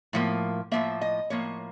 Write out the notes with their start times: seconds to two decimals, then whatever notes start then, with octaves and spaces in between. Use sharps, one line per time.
0.13 A2 F3 A#3
0.72 A2 F3 A#3 E5
1.01 D#5
1.30 A2 F3 A#3 C#5